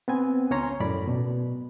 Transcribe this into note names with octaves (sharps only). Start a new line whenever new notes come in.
B3 C4 G#5
C#2 C#4 C#5 A#5 C6 C#6
F#2 A2 D5 B5
B2